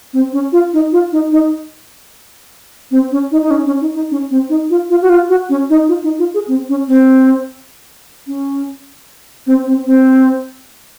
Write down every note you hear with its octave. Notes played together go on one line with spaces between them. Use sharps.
C4
C#4
F4
D#4
F4
D#4
D#4
C4
C#4
D#4
D#4
C#4
C#4
D#4
D#4
C#4
C4
D#4
F4
F4
F#4
F4
F#4
C#4
D#4
F4
D#4
F4
G#4
C4
C#4
C4
C#4
C4
C4
C4